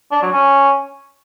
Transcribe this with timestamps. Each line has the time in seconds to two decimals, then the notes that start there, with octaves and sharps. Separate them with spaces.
0.12 D4
0.22 F#3
0.32 C#4